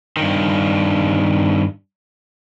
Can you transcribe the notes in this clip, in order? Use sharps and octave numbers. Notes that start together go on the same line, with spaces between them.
G2 D#3